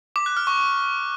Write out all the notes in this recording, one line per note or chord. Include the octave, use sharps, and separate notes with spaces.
D6
F#6
F6
C#6